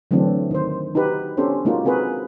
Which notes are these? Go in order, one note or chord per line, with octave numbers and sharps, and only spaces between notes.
D3 E3 F#3 A3 C4 D4
D#3 C5
D#4 F#4 G4 B4
B3 C#4 D4 G4 A4 C5
G#3 A#3 D#4 F4 F#4
C4 F#4 G#4 A#4 B4